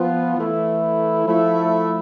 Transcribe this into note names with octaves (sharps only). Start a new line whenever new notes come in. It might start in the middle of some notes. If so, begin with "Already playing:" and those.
Already playing: F3 B3 F4
E3 A3 E4
F3 A3 E4